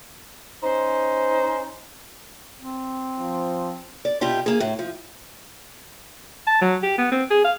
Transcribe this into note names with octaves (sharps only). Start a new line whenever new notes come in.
C#4 D#4 C5
C4
F3
D5
B2 F4 G4 E5
A#3 G#4
A2
F3
A5
F#3
G4
B3
C4
G#4
F5